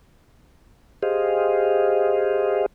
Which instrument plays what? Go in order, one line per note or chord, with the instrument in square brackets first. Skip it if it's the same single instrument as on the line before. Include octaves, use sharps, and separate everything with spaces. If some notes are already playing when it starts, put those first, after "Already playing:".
[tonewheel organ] G4 G#4 C5 D#5 F5